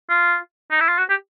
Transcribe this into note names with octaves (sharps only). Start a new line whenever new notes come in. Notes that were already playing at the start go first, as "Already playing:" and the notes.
F4
D#4
E4
F4
F#4
G4